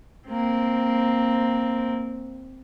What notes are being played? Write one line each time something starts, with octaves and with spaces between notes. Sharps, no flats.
A#3 C4